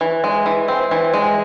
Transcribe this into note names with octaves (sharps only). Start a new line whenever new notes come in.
E3
G#3
E3
C4
E3
G#3